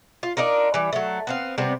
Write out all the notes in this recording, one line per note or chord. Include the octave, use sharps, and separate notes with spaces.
F4
D4 D#4 F4 A#4
E3 G3
F#3 A3
B3 C4 F5
C3 G3 B3 C4